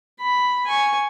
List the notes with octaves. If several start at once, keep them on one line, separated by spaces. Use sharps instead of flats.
B5
G#5 C#6